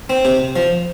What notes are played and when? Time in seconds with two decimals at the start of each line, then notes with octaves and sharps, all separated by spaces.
0.10 C4
0.25 C3
0.56 F3